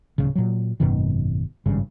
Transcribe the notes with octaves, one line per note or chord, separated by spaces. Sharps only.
D1 A#1 C#3
A#2 F#3
G#1 F#2 B2 D#3
G#1 G2 C#3